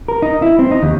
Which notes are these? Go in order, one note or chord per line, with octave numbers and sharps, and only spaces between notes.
A#4
D#4
E4
C4
D#4
D#2